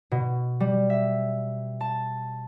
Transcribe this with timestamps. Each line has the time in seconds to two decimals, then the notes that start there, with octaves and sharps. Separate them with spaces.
0.11 B2
0.60 G3
0.90 E5
1.81 A5